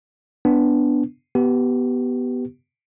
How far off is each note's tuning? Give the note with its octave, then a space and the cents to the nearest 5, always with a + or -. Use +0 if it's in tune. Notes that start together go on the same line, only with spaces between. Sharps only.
B3 +0 D4 +0
B3 +0 G4 -25